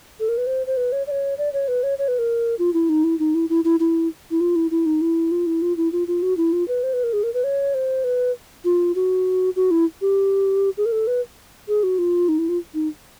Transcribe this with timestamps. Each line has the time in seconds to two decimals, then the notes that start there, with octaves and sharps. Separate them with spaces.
0.20 A4
0.29 A#4
0.38 B4
0.47 C5
0.67 C5
0.77 B4
0.92 C#5
1.07 D5
1.11 C#5
1.38 D5
1.53 C#5
1.68 B4
1.83 C#5
1.99 C#5
2.08 B4
2.19 A#4
2.59 F4
2.74 E4
2.89 D#4
3.04 E4
3.19 D#4
3.35 E4
3.49 E4
3.64 E4
3.80 E4
4.31 E4
4.41 F4
4.56 E4
4.71 E4
4.86 D#4
5.01 E4
5.31 F4
5.47 E4
5.62 F4
5.77 E4
5.92 F4
6.08 F4
6.22 F#4
6.37 E4
6.53 F4
6.68 B4
6.83 C5
6.93 B4
7.04 A#4
7.13 G#4
7.23 A#4
7.34 B4
7.44 C#5
7.74 C5
8.04 B4
8.65 F4
8.95 F#4
9.56 F#4
9.71 E4
10.01 G4
10.77 G#4
10.86 A#4
10.92 A4
11.07 B4
11.68 G#4
11.83 F#4
11.98 F4
12.29 D#4
12.38 E4
12.49 F4
12.74 D#4